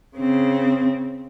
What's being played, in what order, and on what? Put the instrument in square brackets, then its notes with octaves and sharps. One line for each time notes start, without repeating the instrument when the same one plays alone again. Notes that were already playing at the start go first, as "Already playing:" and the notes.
[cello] C#3 C4